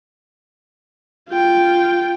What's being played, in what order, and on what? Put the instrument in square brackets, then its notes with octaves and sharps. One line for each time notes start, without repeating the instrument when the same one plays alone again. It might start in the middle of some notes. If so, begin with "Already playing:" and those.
[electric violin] F4 G5